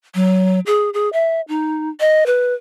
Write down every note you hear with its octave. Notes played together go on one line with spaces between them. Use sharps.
F#3
G#4
G#4
E5
D#4
D#5
B4